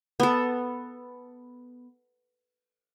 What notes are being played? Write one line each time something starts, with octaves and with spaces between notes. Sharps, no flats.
B3 A4